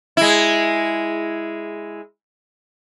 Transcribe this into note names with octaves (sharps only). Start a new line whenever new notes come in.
G#3 E4